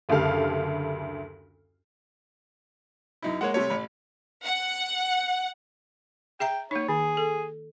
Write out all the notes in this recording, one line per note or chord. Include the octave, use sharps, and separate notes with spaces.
F#1 D2 G4 A4 F5 F6
F#2 D#4 E4
G#3 A#3 C#5 F#5
C3 G3 A3 C#5
A1 B5
F#5
G#4 E5 G5 A#5
A#3 D#4 C#5
D#3 G#4
A4